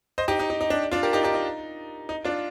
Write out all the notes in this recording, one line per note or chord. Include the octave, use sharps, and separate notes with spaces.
C5 D#5
D#4 G4
D#4
D#4
D#4
D4
D4 F4
G4 A#4
D#4 G4
D#4 G4
D#4
D#4
D4 F4